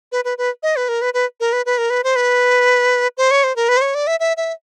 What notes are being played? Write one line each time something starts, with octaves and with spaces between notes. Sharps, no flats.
B4
B4
B4
D#5
B4
A#4
B4
B4
A#4
B4
B4
A#4
B4
C5
B4
C5
C#5
C5
A#4
B4
C5
C#5
D5
E5
E5
E5